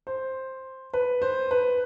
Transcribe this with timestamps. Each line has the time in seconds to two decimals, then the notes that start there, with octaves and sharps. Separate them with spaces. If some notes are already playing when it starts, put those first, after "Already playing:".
0.07 C5
0.94 B4
1.22 C5
1.51 B4